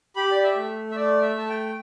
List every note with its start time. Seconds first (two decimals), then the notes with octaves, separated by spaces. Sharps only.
0.16 G4 B5
0.32 D5
0.43 E5
0.56 A3
0.91 E5
0.95 A3 D5
1.22 E5
1.36 A3 A5
1.49 G5